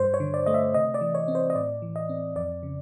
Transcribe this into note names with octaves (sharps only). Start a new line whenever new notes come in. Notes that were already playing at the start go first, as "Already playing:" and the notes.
Already playing: G2 C5
C#5
D3
D5
A3 D#5
E5
C3 D#5
D5
E3
C#5
C4
C5
D#5
A2 D5
E3
D#5
C4
F2 D5
C#3